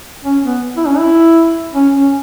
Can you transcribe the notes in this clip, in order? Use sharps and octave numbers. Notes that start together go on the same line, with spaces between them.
C#4
B3
E4
C#4
E4
C#4
C#4